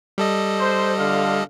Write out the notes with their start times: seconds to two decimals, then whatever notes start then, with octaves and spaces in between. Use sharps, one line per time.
0.18 G3 A4 D#5
0.60 C5
0.98 D3 F4 F5